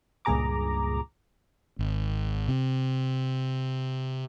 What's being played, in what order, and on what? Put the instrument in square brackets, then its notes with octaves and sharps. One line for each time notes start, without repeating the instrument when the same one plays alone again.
[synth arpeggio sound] C#2 G2 A#2 G#4 A#5 D6
[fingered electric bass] G#1
C3